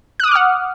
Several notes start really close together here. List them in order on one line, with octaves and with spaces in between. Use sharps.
F#6 D#6 D6 F6 F#5